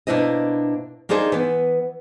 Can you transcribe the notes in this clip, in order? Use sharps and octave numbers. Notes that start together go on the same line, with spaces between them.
B2 A#3 D4 E4 C5 D#5
A#3 D4 D#4 G#4 C5
E3 B3